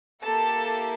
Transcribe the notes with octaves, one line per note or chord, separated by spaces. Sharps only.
A#3 E4 G4 A4 A5